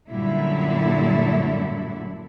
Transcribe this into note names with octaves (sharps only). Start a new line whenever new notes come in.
F#2 A#2 D3 G3 D4 E4